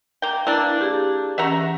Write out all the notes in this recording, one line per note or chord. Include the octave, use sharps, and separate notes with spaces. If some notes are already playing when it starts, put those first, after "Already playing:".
A#3 G5
A#3 D4 E4 B4
G4 G#4
E3 C#4 E5 F#5 A#5